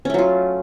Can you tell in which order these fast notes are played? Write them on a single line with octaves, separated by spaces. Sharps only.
C#4 A3 F#3 F4